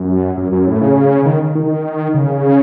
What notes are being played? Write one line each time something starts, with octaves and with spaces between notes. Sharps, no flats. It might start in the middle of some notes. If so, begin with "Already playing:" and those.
Already playing: F#2
F#2
F#2
A2
C#3
D#3
D#3
C#3